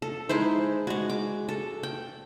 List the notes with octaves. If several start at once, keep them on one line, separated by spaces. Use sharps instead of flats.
A4
G#3 D#4 E4 C5
G#3 F#4
D6
A4
G5